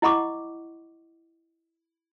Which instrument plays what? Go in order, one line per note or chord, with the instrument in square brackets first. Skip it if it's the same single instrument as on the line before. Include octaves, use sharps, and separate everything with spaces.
[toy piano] E4 D#5 F#5 B5 C#6 D6